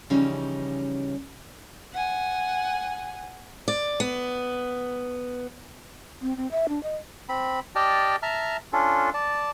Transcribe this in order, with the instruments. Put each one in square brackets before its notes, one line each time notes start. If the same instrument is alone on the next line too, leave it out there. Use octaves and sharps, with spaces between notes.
[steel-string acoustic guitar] C#3 E3 F3 G3 C#4 D#4
[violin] F#5 G#5
[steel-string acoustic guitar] D5
B3
[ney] C4
C4
E5
D4
D#5
[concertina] C4 B5
G4 D5 D#5 G5 A5 F6
E5 A5 A#5 F6
C#4 D4 F4 A4
D5 A5